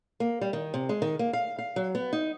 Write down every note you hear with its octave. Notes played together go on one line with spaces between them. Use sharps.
A#3
G3
D#3
C3
G#3
D#3
A#3
F5
F5
F#3
B3
D#4